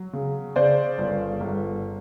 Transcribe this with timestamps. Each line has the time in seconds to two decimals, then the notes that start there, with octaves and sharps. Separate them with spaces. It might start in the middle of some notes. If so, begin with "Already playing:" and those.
Already playing: F#3
0.13 C#3
0.56 C#3 C5 D5
0.98 G1
1.41 G1